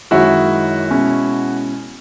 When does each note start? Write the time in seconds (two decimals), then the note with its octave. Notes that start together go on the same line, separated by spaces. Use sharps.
0.11 F#2 D#3 G#3 E4 F#4
0.91 B2 G#3 C#4 E4